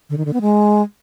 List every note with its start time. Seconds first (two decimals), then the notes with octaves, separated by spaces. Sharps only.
0.10 D3
0.18 D#3
0.25 D3
0.33 B3
0.41 G#3